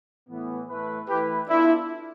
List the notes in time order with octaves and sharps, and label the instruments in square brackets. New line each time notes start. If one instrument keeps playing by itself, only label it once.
[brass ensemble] A2 E3 B3
A2 E3 A3 E4 B4
[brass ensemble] E3 A3 E4 B4 [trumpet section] G4
[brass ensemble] B3 D4 F4 A4 D5 [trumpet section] E4